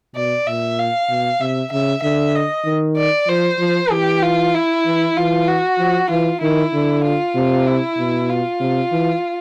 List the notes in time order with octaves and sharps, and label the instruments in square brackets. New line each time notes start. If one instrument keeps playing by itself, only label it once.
[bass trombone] B2 [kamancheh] D5
[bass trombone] A#2 [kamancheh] E5
[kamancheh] F5
[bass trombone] B2
[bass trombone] C3 [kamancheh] E5
[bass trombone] C#3 [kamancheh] E5
[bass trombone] D3 [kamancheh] E5
[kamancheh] D#5
[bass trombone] D#3
[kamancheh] D5
[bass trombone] F3 [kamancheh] C5
[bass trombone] F3
[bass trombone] E3 [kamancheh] G4
[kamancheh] F4
E4
[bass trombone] E3
[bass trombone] E3 [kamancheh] F4
[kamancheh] F#4
[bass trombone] F3
[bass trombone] E3 [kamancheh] F4
[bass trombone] D#3 [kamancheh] E4
[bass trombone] D3
[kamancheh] F4
[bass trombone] C3
[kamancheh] E4
[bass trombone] B2
[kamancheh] F4
[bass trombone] C3
E3